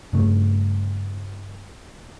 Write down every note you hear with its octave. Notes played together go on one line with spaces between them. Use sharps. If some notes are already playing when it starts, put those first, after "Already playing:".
G2 C#3 A3